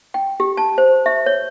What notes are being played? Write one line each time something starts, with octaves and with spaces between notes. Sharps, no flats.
G5
G4
A5
C5
E5
C#5